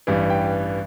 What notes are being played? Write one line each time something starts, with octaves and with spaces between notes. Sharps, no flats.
A1 G2 E3 G3
G5